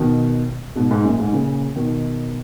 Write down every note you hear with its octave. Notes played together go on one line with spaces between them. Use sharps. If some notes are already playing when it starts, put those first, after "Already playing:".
Already playing: B2 D#3
G#2 B2
G#2
F#2 A#2
G#2
A#2 C#3
B2 D#3